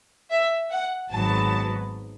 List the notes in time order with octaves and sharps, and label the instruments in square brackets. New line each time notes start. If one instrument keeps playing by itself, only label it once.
[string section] E5
F#5
G#1 G#2 F#3 B3 A5